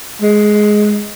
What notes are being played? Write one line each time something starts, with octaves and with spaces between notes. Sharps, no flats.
G#3